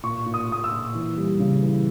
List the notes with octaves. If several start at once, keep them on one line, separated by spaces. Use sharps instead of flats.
A#2 C#6
A#2
D#6
A#2 D#6
E6
A#2
E3
G3
C#3
E3